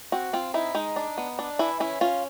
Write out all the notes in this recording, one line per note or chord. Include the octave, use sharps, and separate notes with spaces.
C4 F#4
C4 F4
D#4 E4
G#3 D#4
D4
B3
D4
E3 E4
C#4 E4
C#4 F4